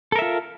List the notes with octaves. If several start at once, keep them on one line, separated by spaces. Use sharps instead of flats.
F4 A4 A#4 E5